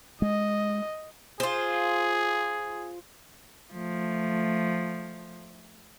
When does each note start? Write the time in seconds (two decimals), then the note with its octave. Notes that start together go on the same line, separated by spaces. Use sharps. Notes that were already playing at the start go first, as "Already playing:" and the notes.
0.22 G#3 D#5
1.40 F4 G#4 C5
3.73 F3 A3